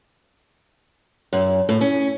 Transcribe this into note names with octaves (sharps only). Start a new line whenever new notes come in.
F#2
A2
C#4